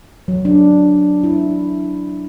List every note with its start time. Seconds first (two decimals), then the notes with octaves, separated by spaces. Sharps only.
0.28 F#3
0.45 D4
1.24 E4